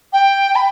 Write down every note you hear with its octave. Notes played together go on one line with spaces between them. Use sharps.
G5
B5